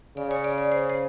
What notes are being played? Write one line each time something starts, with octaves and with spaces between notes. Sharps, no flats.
C#3 D5
C#5
D5
D5
C5
C5